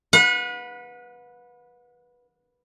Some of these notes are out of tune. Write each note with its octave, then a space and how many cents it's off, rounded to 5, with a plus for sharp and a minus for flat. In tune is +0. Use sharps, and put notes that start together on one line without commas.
B4 -10 F#5 -40